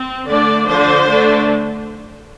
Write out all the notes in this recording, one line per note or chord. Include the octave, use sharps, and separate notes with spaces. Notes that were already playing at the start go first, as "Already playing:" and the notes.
Already playing: C4
D3 A3 D4 D5
D3 F3 D4 C5
D3 A3 D4